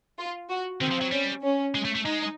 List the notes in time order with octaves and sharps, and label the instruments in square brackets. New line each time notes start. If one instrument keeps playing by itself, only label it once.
[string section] F4
F#4
[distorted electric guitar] D#3 [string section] C4
[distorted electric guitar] F3
F#3
[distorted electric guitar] G3 [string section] C#4
[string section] C#4
[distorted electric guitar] G#3
A3
A3
[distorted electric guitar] G#3 [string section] D#4